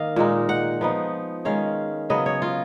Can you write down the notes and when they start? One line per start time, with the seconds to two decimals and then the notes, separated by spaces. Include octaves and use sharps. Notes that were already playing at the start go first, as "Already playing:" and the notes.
Already playing: D#3 A#3 D#5 F5
0.16 A#2 G#3 D#4
0.49 F#5
0.81 F3 B3 D#4
1.45 D#3 G#3 C#4 F5
2.10 C#3 F#3 B3 D#5
2.26 C#5
2.42 F4